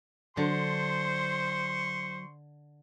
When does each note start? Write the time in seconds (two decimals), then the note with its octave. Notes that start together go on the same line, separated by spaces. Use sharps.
0.37 D3 F#3 C5 C6 C#6